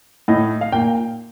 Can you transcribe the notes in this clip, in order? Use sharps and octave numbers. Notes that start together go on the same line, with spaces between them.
A2 D#5
F5
A#2 G5